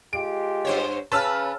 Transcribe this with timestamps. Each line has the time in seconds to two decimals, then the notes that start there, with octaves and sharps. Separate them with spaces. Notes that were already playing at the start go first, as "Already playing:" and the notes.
0.13 G#3 F4 G4 D7
0.65 G2 C5 C#5
1.12 C#3 C#4 B4 A5 E6 F6